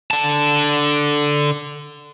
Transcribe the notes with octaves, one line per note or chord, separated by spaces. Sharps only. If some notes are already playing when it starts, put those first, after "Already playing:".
D3 A5